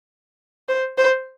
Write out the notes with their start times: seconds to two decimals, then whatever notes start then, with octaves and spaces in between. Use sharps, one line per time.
0.69 C5
0.98 C5